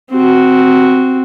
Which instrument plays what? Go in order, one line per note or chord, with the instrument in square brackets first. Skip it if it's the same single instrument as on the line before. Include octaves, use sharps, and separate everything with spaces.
[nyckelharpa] C4 F#4